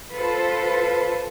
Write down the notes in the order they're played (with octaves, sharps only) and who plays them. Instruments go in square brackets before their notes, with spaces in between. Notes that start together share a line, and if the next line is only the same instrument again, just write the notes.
[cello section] F4 A4 B4 C5